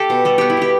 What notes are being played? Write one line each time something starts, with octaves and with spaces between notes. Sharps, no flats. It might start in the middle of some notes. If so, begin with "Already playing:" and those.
Already playing: G4 A4
B2
G3 A4
B3 G4
E4
B2 G4